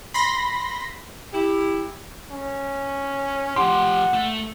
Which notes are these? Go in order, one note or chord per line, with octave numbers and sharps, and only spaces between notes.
B5 C6 A#6
E4 G4
C#4
F3 G4 F#5 C6
A3